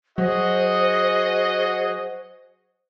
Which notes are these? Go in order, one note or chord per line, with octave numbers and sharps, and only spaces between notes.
F#3 F#4 G#4 C5 D#5